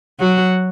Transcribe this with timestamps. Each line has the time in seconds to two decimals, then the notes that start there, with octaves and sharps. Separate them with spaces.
0.20 F#3 F#4